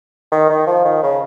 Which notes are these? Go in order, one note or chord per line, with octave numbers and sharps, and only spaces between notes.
D#3
D#3
F3
D#3
C#3